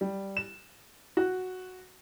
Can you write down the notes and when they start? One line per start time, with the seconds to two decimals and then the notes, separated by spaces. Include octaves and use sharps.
0.01 G3
0.37 E7
1.17 F#4